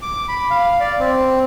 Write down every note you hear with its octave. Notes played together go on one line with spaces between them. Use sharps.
D6
B5
F5
D5
C4